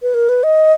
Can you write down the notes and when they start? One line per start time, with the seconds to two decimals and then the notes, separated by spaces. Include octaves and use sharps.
0.02 B4
0.14 A#4
0.29 B4
0.43 D#5